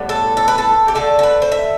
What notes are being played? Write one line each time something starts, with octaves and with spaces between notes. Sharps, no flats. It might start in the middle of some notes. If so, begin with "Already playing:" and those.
Already playing: A2 G3 B3
A4
A4
B4
A4
G4
D3 A3 A4
A4
B4
C5
E5